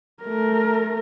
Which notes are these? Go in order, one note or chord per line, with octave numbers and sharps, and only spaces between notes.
A3 A#4